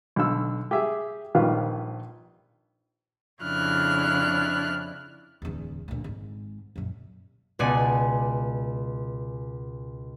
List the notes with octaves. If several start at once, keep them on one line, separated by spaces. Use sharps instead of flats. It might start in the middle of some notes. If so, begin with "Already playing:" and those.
B1 D3 E6
G4 G#4 E5
A#1 D#3 F3 G3 B4 F5
F2 C#3 D4 E4 F6 F#6
D1 E2
D2 A#2
G#1 G#2
F#2 A#2
C#2 B2 D5 G#5 C#7